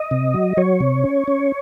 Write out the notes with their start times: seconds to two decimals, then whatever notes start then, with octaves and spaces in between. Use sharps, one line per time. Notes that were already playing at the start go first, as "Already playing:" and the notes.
Already playing: D#5
0.11 C3
0.34 F#3
0.57 F#3 C#5
0.80 C3
1.04 C#4
1.28 C#4